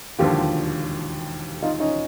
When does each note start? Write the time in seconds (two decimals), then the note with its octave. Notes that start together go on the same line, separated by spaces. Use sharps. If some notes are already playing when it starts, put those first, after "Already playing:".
0.19 E1 D#2 D3 F3 F4 G4
1.63 D#4 F4
1.80 C#4 D#4